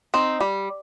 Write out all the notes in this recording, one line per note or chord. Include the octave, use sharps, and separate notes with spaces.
C4 D#4
G3